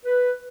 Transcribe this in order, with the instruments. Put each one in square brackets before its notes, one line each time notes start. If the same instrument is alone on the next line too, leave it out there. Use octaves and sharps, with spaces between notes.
[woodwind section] B4